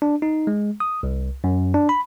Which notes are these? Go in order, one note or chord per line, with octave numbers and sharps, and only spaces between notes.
D4
D#4
G#3
D#6
C2
F#2
D4
B5